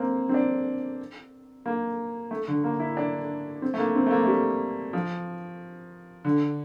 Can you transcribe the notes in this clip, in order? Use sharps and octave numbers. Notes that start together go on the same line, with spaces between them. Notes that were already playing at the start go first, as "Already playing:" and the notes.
Already playing: A#3 C4
C4
D4
A#3
A3
D3
A#3
E4
D4
C4
A3
A#3
C4
A3
A#3
A3
G3
F3
D3